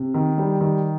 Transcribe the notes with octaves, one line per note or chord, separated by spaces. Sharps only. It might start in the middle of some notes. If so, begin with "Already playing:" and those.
Already playing: C3
D#3
G3
D#3